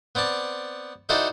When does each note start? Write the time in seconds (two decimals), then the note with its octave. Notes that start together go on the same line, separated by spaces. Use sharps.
0.15 B3 C4 D5 A5
1.09 D#4 E4 F#4 A4 C5 D5